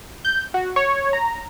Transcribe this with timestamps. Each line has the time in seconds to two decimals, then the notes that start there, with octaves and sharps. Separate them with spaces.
0.25 G6
0.54 F#4
0.76 C#5
1.13 A#5